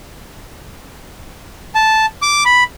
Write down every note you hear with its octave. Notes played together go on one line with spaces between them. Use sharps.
A5
D6
B5